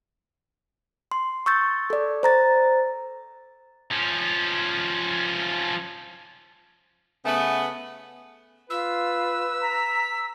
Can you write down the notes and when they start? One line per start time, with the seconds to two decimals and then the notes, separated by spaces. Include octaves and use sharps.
1.11 C6
1.46 C#6 E6 G6 A6
1.90 A4 D5
2.23 C5 A#5 A6
3.91 F3 C#4
7.25 C#3 A3 B3
8.70 F4 B4 E6
9.61 A#5 B6